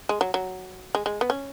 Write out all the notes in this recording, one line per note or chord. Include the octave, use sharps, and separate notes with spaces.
G#3
F#3
F#3
G#3
G#3
B3
C#4